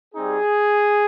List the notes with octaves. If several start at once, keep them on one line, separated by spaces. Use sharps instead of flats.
G3 C4 D#4 G#4